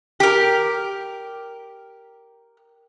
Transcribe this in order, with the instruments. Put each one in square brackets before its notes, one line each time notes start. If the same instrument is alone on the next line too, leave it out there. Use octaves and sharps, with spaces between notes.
[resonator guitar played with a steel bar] G4 A#4